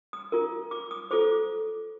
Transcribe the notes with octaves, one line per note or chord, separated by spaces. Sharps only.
D#6
F4 A#4
D6
D#6
F4 A4 C5 D6